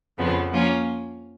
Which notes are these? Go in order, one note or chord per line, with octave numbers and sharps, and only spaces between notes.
F2 C#3 F3 B3
F3 A#3 C#4 F4